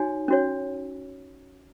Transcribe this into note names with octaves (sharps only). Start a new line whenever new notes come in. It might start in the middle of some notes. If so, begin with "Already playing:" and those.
Already playing: D#4 F#4 C#5 G#5
C#4 F#4 C#5